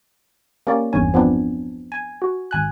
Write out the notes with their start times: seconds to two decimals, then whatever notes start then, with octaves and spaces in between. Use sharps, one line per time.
0.67 A#3 C#4 G4 D5
0.93 G1 E2 G2 C#4 G#5
1.14 F3 B3 C4 D4
1.92 G#5
2.22 F#4
2.51 G#1 G#5 F#6